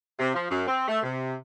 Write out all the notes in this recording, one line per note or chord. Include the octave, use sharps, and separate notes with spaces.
C3
F3
F#2
C4
A3
C3